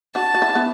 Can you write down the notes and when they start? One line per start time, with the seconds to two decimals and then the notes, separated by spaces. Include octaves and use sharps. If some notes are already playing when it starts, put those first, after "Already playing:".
0.15 D4 F#4 A5
0.35 F#4
0.42 E4
0.49 D4
0.55 B3 E4